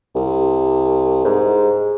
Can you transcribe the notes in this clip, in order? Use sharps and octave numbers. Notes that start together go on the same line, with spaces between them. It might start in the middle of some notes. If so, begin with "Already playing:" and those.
C2
G#2